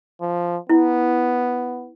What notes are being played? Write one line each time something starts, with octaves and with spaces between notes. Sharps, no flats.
F3
B3 E4